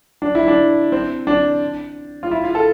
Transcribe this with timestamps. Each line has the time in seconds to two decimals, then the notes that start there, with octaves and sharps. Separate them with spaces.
0.22 D4
0.35 E4
0.48 D4
0.92 C4
1.27 D4
2.23 F4
2.31 E4
2.44 F4
2.55 A4